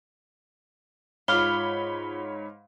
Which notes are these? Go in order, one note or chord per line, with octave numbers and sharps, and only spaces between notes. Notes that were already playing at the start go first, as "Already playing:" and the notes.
G#2 F4 C#5 F5 B5 D6 F6 G7